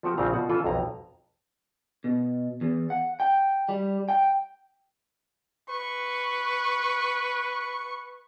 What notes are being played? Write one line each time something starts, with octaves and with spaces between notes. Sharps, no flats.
F3 A3 C4 F#4 G4
A#1 C#3 C4 A#5
B2 F4 F#4 F#5
E3 C#4 F4 A4 B4 E5
B1 F2 A#5
B2
E2
F#5
G5
G3
G5
B4 C#6